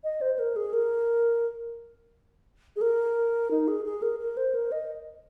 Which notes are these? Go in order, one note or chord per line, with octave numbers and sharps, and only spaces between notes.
D#5
C5
C5
A#4
G#4
A#4
G#4
A#4
D#4
G#4
G#4
A#4
A#4
C5
A#4
D#5